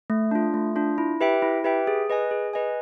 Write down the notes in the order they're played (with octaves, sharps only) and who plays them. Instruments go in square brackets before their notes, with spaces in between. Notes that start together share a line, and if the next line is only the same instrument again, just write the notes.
[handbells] A3
D4 F4
A3
D4 F4
E4
G4 B4 E5 G5
E4
G4 B4 E5 G5
G#4
B4 D#5 G#5
G#4
B4 D#5 G#5